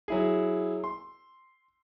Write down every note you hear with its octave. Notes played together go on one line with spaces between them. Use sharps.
F#3 E4 G#4
C6